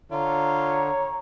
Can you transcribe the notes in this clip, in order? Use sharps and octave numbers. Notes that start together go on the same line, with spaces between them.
D3 F4 C#5 A#5